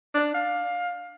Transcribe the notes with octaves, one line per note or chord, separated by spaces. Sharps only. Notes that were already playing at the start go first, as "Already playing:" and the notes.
D4
F5